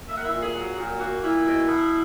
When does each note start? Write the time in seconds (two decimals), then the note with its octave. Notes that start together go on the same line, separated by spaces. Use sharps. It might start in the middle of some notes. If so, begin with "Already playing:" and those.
0.08 A#3 E5
0.16 F#5
0.24 E5
0.31 A#2
0.42 G#4
0.54 F#3
0.76 A#2 F#4
0.99 A#3 F#4
1.22 A#2 E4
1.45 B2
1.67 B2